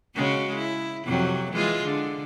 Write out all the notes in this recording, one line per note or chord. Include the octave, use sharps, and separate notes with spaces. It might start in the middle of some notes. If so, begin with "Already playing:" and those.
C#3 G#3 F#4
E4
F2 C3 F#3
E3 G#3 F4
D3